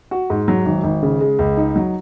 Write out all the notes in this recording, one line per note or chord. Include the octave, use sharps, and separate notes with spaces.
F#4
G#2
F#3
G#1
G#1
C#3
G#3
C#2
D#4
F#3